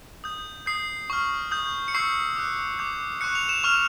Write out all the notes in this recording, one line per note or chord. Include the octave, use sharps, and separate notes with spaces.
D#6 G6
D#6 G6 C7
C#6 F6
D#6 G6
C#7
C#6 E6 G6 C7
D6 F#6
D6 G6
C#6 F#6 C#7
F7
E7
C#6 F6 F7